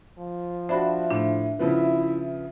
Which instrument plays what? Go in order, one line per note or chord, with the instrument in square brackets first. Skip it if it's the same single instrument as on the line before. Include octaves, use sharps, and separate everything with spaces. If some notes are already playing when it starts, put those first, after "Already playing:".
[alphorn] F3
[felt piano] D4 F#4 [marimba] C5 B5 [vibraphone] E5
[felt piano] A2 [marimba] D4
[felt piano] C#3 F3 B3 [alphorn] E4